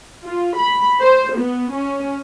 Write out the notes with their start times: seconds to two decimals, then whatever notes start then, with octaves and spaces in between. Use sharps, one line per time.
0.25 F4
0.58 B5
1.01 C5
1.36 B3
1.71 C#4